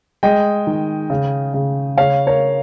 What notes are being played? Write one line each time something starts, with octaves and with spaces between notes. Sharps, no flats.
G#3 D#5 G5
D#3
C#3
C#3
C#3 C#5 F5
A#4 C#5